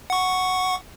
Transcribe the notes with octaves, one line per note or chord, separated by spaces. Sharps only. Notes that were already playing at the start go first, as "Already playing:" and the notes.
F#5 C#6